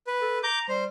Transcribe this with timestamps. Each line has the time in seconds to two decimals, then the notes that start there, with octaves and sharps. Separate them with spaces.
0.07 B4
0.21 A4
0.43 A#5 D6 G6
0.69 G3 C5